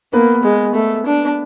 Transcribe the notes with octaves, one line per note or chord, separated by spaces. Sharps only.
A#3 B3 B4
G#3
A3
D4